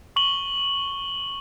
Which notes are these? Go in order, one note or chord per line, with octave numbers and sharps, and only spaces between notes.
C#6 F#7 G7